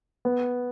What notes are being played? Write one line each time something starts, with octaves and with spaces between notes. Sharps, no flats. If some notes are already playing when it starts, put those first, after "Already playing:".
B3